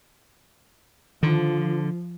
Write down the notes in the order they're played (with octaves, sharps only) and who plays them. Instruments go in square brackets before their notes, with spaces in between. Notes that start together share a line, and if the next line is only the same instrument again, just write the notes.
[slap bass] D3 [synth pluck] D#3 [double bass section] F3